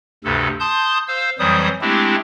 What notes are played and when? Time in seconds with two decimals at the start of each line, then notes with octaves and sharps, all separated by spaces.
0.24 D2 G2 C3 A4
0.60 A5 C6 D#6 G6
1.08 C5 F5 E6
1.39 F2 E3 F#3 G3 C5 D#6
1.81 G#3 A3 C4 D4 E4 G4